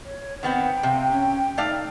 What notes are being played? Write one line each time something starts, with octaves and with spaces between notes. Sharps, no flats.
C#5
D#3 B3 C4 F#5 G5
C3 F5
C#4
A3 D#4 D5 F5